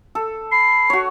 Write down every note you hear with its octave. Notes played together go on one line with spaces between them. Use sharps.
A4
B5 C7
F#4 C#5